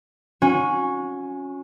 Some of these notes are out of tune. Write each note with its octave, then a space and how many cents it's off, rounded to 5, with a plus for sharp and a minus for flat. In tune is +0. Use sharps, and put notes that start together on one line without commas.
C#4 +0 F#4 -35